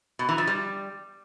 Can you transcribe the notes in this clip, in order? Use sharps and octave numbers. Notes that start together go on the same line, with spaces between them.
B2
E3
F3
G3